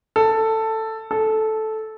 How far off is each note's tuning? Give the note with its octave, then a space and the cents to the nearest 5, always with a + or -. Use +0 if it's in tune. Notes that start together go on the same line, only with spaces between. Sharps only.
A4 +10
A4 -10